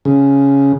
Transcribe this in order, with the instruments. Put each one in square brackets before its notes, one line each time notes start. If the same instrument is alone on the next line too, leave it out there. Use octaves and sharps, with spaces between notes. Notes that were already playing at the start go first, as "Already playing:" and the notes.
[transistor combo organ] C#3